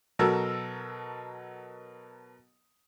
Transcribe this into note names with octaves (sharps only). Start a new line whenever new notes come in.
B2 F#3 A4 A#4 E6